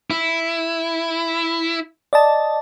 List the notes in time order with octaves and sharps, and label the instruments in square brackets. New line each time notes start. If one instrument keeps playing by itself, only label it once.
[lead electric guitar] E4
[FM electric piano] D5 D#5 A5